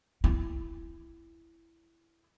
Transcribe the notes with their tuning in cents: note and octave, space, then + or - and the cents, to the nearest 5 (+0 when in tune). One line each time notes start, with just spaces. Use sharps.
E4 +10